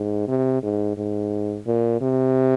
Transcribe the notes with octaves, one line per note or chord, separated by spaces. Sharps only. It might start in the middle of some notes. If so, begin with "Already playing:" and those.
Already playing: G#2
C3
G#2
G#2
A#2
C3